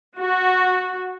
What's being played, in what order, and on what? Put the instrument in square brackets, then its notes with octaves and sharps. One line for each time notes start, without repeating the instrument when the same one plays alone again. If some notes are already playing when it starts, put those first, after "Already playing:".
[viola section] F#4